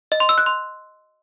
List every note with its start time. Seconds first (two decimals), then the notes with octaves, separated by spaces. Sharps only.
0.12 D#5
0.20 C6
0.29 E6
0.38 F#6
0.46 C6